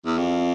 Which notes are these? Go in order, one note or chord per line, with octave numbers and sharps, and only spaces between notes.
E2
F2